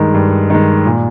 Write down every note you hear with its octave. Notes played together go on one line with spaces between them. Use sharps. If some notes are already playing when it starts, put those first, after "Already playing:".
Already playing: G2 D#3 G#3
G2
D#3 G#3
A#2